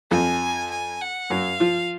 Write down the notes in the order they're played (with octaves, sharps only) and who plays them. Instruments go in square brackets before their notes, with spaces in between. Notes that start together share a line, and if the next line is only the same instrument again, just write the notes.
[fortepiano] F2 F3 [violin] G#5
[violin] G#5
F#5
[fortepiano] F#2 F#3 [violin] F5
[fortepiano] F3 F4